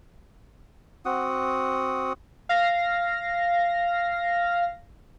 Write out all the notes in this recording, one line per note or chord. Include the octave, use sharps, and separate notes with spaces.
C4 F#4 F#5 D#6
F5 A#6